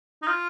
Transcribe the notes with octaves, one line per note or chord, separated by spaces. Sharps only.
D#4
F4